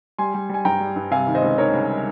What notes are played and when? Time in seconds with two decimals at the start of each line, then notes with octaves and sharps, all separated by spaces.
0.18 G3 G#5 C6
0.34 G3
0.49 G3 G#5
0.65 G2 G5 A#5
0.80 G3
0.96 G2
1.11 C3 F5 G#5
1.27 D#3
1.35 C5 D#5
1.42 C#2
1.58 D#3 A#4 C#5
1.73 C#2